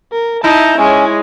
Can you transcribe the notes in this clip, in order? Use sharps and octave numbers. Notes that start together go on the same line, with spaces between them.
A#4
D#4 E4 A5 A#5 G6
G#3 C#4 C#5